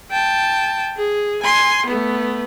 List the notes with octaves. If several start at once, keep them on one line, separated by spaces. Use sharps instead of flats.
G5 A5
G#4
G#5 C6
A3 B3